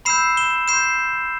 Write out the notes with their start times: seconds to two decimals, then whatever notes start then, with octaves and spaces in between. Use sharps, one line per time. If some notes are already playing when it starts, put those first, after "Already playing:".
0.05 B5 E6 G6 C7 E7
0.37 E7 G7
0.68 C6 G6 C7 E7